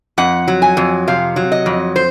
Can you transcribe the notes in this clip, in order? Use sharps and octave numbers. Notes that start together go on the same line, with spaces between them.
F2 F#5
F#3
G#5
F2
C3 F5
F#3
D#5
F2
C5